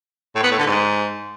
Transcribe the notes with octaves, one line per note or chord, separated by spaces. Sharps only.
A2
B3
A2
D3
G#2